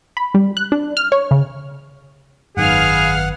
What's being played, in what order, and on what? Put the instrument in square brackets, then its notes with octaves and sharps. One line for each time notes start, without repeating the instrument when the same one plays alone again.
[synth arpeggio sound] B5
G3
F#6
D4
F6
C#5
C#3
[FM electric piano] G#1 F#2 D#3 [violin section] B3 F5 F6 [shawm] G#4 [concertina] F#5